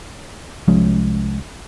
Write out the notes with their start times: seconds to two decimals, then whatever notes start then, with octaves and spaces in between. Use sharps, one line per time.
0.68 C2 F3 G#3 C#4